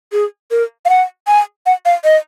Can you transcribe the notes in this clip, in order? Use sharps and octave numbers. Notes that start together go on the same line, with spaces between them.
G#4
A#4
F5
F#5
G#5
F#5
F5
D#5